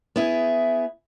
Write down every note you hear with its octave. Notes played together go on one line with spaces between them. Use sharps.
B3 E4 G#4